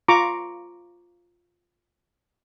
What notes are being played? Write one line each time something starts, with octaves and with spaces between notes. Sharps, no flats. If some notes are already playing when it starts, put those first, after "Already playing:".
F4 A#5 C#6 D6